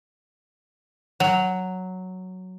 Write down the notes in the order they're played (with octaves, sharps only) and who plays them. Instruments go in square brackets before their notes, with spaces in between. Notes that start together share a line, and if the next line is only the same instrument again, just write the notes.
[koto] F#3